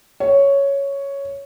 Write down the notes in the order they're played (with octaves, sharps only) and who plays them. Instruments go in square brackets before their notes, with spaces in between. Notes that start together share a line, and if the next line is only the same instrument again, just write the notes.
[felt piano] C#5